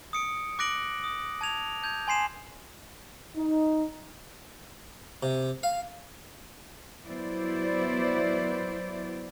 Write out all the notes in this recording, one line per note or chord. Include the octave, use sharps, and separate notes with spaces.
D#6 C#7 D7
D6 F#6 A#6 D7 F#7
D#6
A5 G#6 F7
A5 G6 G#6 F7
G#5 C6 C7 E7
D#4
C3
F5
F#3 B3 E4 C5 D5